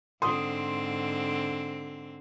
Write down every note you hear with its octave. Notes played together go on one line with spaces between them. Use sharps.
G#2 D3 C4 C6 D#6